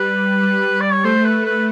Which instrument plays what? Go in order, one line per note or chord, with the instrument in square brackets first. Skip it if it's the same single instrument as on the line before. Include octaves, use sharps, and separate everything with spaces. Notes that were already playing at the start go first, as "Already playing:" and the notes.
Already playing: [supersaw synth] G3 [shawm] B4
[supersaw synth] G3
[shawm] D5
C#5
[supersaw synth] A3 [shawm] C5
[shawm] B4
B4